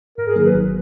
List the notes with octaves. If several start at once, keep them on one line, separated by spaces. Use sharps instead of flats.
G#2 A#4
G#4
D#3 F#3 A#3 D#4
B4
G#1